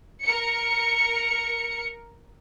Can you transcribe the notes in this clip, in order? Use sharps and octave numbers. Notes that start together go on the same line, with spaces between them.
A#4 C#7